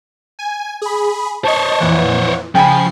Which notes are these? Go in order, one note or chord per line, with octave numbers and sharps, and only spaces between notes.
G#5
G#4 B5
C5 C#5 D#5 A5
F2 A#2 E3 F#5
C#3 F3 G5 G#5 B5 C7